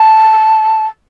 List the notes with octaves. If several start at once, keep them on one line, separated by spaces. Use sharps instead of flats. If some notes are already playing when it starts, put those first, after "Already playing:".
Already playing: A5